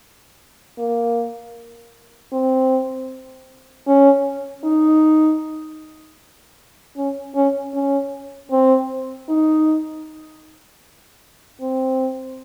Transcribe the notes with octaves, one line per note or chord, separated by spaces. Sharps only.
A#3
C4
C#4
D#4
C#4
C#4
C#4
C4
D#4
C4